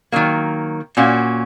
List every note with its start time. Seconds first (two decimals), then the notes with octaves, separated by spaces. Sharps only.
0.12 D#3 F#3 A#3
0.97 A#2 A#3 C#4 F#4